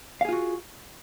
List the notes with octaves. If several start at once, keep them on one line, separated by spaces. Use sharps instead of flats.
F4 F#4 G#4 F5